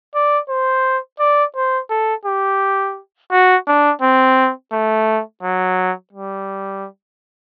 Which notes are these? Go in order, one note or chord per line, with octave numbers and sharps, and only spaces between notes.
D5
C5
D5
C5
A4
G4
F#4
D4
C4
A3
F#3
G3